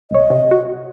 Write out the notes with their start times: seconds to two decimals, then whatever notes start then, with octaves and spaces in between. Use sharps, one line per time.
0.11 C2 C#5 D#5
0.30 C3
0.51 F#4